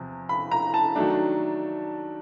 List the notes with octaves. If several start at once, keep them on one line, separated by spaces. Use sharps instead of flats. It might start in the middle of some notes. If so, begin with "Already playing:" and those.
Already playing: E2 C3 F3
B5
A#5
A5
D#3 F#3 A3 D4